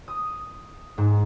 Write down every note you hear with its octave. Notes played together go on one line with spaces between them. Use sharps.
D#6
G#2